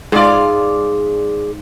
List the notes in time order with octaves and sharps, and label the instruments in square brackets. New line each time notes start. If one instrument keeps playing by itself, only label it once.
[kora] G#2 F4 [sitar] G#4 D5